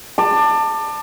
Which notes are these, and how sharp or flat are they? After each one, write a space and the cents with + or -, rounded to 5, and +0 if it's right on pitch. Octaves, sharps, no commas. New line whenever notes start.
A5 +20 D6 +25